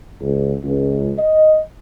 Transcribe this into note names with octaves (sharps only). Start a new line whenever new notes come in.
C#2
C#2
D#5